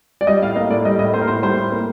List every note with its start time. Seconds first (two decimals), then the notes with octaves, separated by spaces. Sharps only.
0.21 D5
0.27 G3 D#5
0.42 A2 F5
0.56 A#3 D#5
0.70 A2 D5
0.85 G3 D#5
0.99 A2 D#5
1.14 A#3 C5
1.21 A#4
1.28 A2 C5
1.43 G3 C5
1.57 A2
1.72 A#3